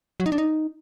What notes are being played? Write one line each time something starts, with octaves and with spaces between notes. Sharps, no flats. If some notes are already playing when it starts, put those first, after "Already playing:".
F#3
D#4
D4
D#4